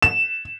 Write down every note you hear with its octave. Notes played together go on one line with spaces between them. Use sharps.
E7